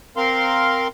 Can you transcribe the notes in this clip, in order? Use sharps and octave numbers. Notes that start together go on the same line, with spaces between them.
C4 A#4 F5 C6